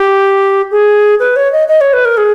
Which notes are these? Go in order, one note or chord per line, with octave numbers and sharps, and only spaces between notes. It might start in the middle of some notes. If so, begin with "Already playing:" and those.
Already playing: G4
G#4
B4
C#5
D#5
D#5
C#5
B4
A#4
G#4